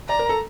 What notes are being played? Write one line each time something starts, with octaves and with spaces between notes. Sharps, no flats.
D5 A#5
A#4
A4